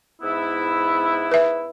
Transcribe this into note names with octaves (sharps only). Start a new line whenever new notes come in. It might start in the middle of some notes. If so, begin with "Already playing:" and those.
G#2 B3 E4
B4 E5